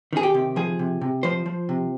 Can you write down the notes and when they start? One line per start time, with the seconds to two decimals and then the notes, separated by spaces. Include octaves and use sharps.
0.13 D#3 G#4
0.23 G4
0.34 C3
0.56 F3 G#4
0.79 C3
1.01 C3
1.23 F3 C5
1.46 F3
1.69 C3